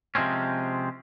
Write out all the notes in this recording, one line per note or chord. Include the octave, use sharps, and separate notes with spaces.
C3 F3 G#3 C4 C#4